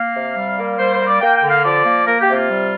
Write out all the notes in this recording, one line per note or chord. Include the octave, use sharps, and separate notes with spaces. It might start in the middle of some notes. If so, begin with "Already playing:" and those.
Already playing: A#3 F5
C3
G3
A#3
G3 C5
C5
A#3
D5
A#3 G5
G5
D3
F5
F3 D5
A#3
A#3 A#4
G4
C3
F4
G3